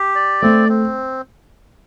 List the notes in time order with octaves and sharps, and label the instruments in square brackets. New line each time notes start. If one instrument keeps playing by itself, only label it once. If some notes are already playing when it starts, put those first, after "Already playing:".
Already playing: [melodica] G4
D5
[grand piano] A3 [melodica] C4
[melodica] C4